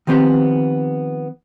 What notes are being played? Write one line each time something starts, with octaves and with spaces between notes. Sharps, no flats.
D#3 F3 B3 C4 G4 C5